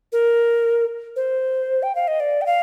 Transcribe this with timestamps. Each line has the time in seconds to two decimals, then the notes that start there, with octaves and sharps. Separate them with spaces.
0.12 A#4
1.16 C5
1.83 G5
1.95 F5
2.08 D#5
2.20 D5
2.41 G5
2.46 F5